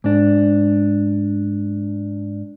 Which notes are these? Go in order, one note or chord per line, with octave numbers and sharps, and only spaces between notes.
G#2 D4